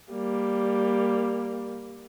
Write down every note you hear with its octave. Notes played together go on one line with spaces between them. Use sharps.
G3 A#3